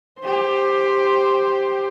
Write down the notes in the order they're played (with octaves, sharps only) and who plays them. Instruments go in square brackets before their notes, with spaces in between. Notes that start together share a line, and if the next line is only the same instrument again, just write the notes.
[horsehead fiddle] G4 C5